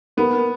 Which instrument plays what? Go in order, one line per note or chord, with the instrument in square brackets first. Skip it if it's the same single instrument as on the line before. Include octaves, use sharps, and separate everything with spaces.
[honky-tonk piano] A#3 [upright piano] B3